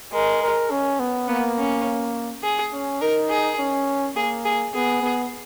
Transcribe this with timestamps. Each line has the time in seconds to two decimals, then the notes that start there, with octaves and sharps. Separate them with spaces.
0.13 G#3 A#4
0.42 A#4
0.70 C#4
1.00 B3
1.28 A#3 B3
1.57 C#4
2.44 G#4
2.72 C#4
3.01 D#4 A#4
3.30 G#4
3.59 C#4
4.16 A#3 G#4
4.45 G#4
4.74 B3 G#4
5.02 B3